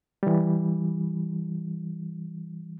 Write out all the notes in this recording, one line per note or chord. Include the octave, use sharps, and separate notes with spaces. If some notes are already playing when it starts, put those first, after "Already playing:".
E3 G3